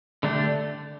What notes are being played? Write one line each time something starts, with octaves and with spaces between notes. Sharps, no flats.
D3 A3 D4 G4